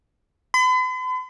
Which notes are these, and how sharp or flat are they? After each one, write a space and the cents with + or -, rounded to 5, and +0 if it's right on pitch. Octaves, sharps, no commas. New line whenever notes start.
B5 +45